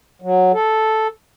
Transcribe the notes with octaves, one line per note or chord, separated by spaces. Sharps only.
F#3
A4